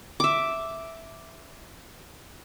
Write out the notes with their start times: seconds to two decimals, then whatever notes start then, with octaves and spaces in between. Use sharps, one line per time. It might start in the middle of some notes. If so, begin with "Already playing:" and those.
0.20 E5 D6